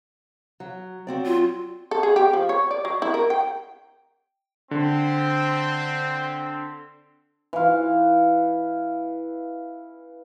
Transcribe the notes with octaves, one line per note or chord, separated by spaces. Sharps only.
F#3
F#3 C4 D5
F4
A4
G#4
G4
F3
C#5
D5
F#3
E4
A#4
G5
D3 C4
E3 F5